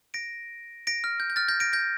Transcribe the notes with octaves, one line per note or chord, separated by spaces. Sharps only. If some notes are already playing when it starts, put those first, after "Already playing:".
A#6 D7
A#6 D7
F6
G6
G6
F6 A6
G6 A#6
A#6 D7
G6 A#6